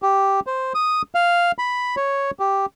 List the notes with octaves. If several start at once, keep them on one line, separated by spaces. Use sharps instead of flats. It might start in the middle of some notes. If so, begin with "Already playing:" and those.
G4
C5
D#6
F5
B5
C#5
G4